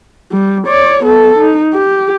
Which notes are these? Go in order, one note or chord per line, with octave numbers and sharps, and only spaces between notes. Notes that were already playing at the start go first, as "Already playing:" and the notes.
G3
C#5 D5
B3 A4
D#4
G4